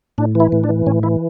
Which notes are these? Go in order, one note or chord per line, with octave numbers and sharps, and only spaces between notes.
A2 D4
E3 E4
A2
D4
E3
A2 C#4
E3 E4